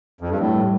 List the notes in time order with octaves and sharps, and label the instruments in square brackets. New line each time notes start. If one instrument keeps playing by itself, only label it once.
[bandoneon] F2
G2
[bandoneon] A2 [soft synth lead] G3
[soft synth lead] G3